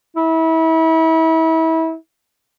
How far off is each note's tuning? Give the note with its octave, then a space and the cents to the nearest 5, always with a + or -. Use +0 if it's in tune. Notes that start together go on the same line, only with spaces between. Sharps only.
E4 -30